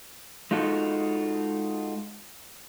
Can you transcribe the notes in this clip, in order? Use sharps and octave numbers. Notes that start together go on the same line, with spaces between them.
G#3 D#4 F4 F#4 A4